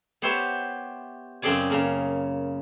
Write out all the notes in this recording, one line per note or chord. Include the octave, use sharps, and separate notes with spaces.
B3 G4 C5 C#5 E5 G#5
F#2 C#3 C4 G#4 D5 G#5
C#3 A#3